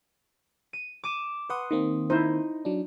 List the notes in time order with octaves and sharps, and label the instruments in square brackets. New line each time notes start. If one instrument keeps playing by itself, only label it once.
[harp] D#7
D6 D#7 E7
[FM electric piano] B4 F#5 [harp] C6 D#6
[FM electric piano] D#3 A#3 C4
[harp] D#4 [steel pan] E4 C5
[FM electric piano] F#3 D4